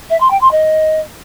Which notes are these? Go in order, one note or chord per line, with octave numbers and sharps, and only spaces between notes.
E5
C6
G5
C6
D#5